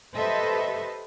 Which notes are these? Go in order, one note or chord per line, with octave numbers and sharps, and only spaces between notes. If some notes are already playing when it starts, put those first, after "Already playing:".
G4 A4 B4 C5 D#5 E5